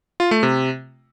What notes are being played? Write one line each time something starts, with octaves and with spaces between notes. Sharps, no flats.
F4
A3
C3